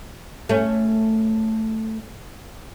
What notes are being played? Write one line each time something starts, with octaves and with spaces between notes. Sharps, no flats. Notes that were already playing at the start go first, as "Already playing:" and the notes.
A3 C#4